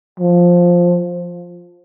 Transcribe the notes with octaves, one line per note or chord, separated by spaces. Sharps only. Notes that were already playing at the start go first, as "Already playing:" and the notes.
F3